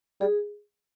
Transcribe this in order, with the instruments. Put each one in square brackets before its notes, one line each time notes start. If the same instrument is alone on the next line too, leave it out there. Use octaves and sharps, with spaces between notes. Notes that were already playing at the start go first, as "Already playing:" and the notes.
[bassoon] G3 [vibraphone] G#4